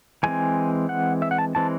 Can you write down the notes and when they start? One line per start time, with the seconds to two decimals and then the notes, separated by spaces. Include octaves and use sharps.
0.23 E3 G#3 C4 G#5
0.89 F#5
1.22 E5
1.31 F#5
1.38 A5
1.55 E3 G#3 C4 A5